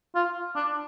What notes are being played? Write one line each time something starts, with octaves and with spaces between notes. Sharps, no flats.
F4
D4